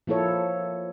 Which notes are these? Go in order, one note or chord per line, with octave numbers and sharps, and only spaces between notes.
F3 A#3 E4 A4 C#5